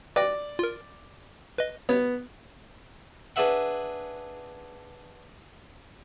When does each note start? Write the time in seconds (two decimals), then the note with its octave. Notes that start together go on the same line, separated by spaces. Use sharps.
0.16 B4 D5 G5 A#6
0.59 F4 A#4
1.58 B4 D#5
1.89 B3 C#5
3.36 D4 G#4 B4 E5 F#5